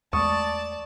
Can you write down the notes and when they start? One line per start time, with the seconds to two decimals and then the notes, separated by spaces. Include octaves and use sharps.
0.13 E2 G#3 A3 D5 A5 C#6 D#6